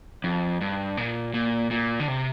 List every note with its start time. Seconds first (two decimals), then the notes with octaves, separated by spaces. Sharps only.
0.24 F2
0.61 G2
0.97 A#2
1.34 A#2
1.71 A#2
2.00 D3
2.08 C3